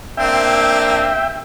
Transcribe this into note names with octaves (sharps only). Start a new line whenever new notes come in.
A#3 C4 D4 E5 G5